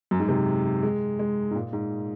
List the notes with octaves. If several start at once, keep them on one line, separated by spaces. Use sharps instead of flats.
F#2
G#2
C3
G#3
G#3
G#2
A#2
G#2